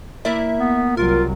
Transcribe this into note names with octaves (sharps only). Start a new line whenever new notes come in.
A#3 E4 D5 E5
B3
C2 F#3 F4 A#4